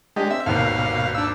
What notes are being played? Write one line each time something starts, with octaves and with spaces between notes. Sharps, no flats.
G#3 D4 G4 D#5
C4 E5
G#1 D#2 B2 F5
D4 E6